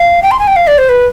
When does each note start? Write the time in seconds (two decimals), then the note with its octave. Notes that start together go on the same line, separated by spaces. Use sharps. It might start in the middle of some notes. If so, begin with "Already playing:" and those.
Already playing: F5
0.23 G5
0.31 C6
0.39 G#5
0.47 G5
0.56 F5
0.67 D5
0.78 C5
0.89 B4